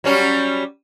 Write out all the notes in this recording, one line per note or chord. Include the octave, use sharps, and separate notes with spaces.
F#3 G3 C#4